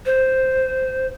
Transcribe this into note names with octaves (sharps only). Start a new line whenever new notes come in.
C5